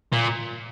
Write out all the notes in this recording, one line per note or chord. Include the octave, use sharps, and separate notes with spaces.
A#2